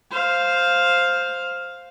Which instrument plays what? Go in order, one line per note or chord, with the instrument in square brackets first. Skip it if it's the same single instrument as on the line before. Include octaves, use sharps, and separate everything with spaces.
[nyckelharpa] C5 F5